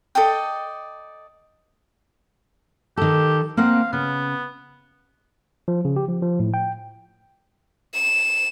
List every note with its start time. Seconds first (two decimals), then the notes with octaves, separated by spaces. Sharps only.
0.15 A4 D5 D#5 G5
2.97 D#3 G4 A4
3.57 A#3 C4 F5 F#5
3.93 C#3 B3
5.68 F3
5.85 C#3
5.96 G4
6.08 F3
6.22 F3
6.40 A2
6.54 G5
7.94 E7